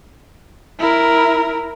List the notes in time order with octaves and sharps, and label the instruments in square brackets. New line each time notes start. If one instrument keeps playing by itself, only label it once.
[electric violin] E4 A#4